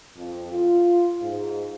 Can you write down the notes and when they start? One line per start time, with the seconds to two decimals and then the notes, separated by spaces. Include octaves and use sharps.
0.17 F2
0.52 F4
1.22 G#2